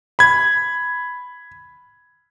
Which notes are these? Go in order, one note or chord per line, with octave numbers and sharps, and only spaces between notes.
B5 G#6